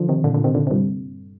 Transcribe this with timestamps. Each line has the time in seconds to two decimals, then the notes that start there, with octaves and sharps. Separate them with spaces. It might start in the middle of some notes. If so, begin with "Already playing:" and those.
Already playing: D3 F3
0.09 C3 D#3
0.24 A#2 D3
0.34 A#2 D3
0.44 C3 D#3
0.55 A#2 D3
0.67 C3
0.71 G2 A#2